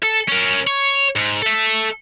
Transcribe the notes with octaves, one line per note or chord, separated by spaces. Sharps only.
A4
C#4 A#4
C#5
G#2
A4 E5